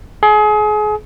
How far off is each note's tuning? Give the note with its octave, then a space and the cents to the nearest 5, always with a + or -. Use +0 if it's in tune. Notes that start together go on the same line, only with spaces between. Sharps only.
G#4 +30